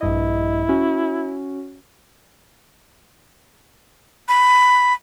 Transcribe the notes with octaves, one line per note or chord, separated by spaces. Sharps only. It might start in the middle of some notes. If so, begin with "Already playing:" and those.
A#1 G2 E4 D#5
C#4 F#4
B5